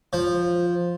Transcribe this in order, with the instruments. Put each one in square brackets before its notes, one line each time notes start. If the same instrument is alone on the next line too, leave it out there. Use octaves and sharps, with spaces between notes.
[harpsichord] F3